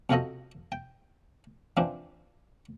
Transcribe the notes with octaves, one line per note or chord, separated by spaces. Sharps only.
F2 C3 F4 F#4 A4 D#5
G5
E3 F3 C4 D4